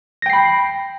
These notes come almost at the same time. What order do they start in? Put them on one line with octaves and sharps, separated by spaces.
A#6 G5 C7 B5